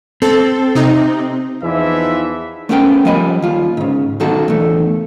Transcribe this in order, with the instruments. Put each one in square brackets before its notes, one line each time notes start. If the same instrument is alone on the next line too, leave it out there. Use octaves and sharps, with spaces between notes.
[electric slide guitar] C4 [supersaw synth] A4
[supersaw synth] C3 D#4
[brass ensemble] E2 E3 F3 D#4 E5
[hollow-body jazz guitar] A3 B3 C#4 E4 A#4 G5
F3 G3 D#5 G#5 B5
D#2 F4
G#2 C#3
B1 D#3 F#4 A4
E2 A3